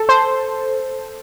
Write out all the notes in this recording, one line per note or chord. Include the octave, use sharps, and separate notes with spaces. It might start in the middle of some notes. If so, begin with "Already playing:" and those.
Already playing: A4
C5